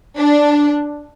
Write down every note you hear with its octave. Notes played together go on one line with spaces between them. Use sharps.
D4